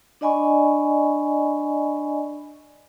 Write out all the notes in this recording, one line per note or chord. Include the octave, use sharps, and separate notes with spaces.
D4 D5 D#5 G#5 B5 C#6